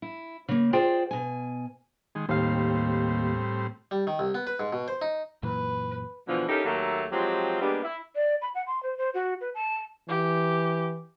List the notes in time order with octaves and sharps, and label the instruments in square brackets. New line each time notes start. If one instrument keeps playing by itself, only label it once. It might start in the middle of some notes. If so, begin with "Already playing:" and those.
[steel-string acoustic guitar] E4
C#3 A#3
F4 G#4 C5 D5 G5
B2 G#5
[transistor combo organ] D#3 G#3
[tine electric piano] D#2 F5 [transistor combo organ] A2 G3 C4
[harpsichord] G3
D#3
C2
B3
B4
G#2
B2
C5
D#4
[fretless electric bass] F#2 A#2 E3 [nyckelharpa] B4
[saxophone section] B2 D3 E3 F3
C#4 D#4 E4 G4 A4 A#4
D#2 F#3 A3 A#3 A4 E5
F3 F#3 G#3 C4 F4 G4
G3 G#3 A#3 B3 D4 G4
E4
[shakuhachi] D5
B5
F#5
C6
C5
C5
F#4
B4
A5
[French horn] E3 [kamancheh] G4